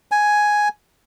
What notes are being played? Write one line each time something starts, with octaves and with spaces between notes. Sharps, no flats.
G#5